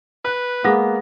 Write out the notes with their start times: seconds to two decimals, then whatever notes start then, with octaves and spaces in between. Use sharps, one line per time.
0.25 B4 F#6
0.64 G#3 A#3 B3 D6 A#6